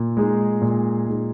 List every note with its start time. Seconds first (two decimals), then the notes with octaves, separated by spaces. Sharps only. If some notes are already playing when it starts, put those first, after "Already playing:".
Already playing: A#2
0.17 G#3 D#4 G#4
0.62 A#2
1.07 G#3 D#4 G#4